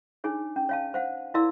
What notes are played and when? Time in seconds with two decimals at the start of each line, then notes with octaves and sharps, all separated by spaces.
0.24 D4 D#4 G#4 C#5
0.56 C#4
0.69 C#5 F5 A5
0.94 C5 F5 F#5
1.34 E4 A#4 D5 F5 C6 E6